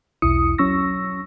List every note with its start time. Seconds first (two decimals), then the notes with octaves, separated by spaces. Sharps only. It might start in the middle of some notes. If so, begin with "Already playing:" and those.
0.22 B1 E2 E4 D#6 C#7
0.58 F#3 C#4 C#6 E6 A#6